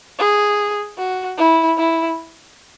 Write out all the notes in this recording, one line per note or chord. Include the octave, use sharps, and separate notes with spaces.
G#4
F#4
E4
E4